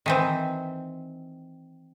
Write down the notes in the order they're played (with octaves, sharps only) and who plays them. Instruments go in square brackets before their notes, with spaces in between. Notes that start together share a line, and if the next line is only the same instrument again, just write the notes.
[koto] D#3 E3 C4